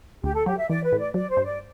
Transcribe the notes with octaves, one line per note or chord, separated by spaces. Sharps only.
D2 G4
A4
F#3 G4
E5
E3 D5
B4
A2
D5
F#3 D5
C5
G2
D5